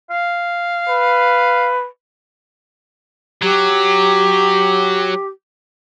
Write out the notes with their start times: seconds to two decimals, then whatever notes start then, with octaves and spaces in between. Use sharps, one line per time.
0.10 F5
0.89 B4
3.42 F#3 G4